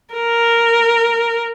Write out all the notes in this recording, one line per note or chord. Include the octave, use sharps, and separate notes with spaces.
A#4